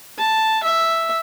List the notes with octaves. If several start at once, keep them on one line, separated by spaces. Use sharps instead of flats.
A5
E5